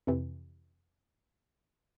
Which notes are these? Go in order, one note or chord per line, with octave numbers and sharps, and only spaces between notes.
F2 C3 E3